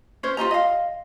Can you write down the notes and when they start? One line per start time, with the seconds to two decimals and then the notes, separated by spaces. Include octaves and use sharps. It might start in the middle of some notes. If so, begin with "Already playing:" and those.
0.23 C#4 C5 C#5
0.37 F4 G4 D#5 A#5
0.51 D#5 F5